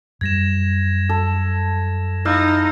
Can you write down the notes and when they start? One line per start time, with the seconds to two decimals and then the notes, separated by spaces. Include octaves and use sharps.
0.21 F#2 G3 G#6 A#6 E7
1.09 A4
2.25 D#4 E4 F5 E6 G6